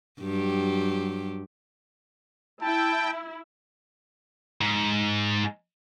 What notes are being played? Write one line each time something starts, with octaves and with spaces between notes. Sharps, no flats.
G2 F#3 G4
E4 G5 A5
G#2